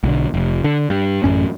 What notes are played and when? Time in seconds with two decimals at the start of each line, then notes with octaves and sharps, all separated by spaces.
0.04 B1 D3
0.34 F1
0.64 D3
0.90 G2
1.24 A1 F#2 C#4